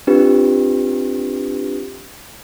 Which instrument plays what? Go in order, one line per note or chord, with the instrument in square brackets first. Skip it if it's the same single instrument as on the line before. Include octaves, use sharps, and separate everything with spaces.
[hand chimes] C4 D4 F4 G4 B4